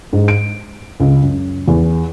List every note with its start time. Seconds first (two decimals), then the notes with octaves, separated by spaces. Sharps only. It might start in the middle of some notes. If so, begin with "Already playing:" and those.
0.13 G#2
0.28 D7
1.00 C#2
1.22 F#2
1.68 E2